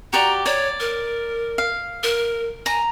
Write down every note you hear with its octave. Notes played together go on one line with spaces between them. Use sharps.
F#4 G4 D5 A#5
C#5 D5
A#4
F5
A#4
G#5 A#5